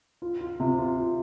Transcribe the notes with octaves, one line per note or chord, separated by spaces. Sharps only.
F4
F4
C3
F4
F4